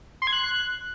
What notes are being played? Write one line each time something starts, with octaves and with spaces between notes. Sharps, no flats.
C6
G#6
F#6